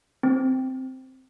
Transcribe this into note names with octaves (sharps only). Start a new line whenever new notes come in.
C4